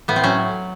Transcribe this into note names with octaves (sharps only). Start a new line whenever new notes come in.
A2 B3
C4
F#3 C#4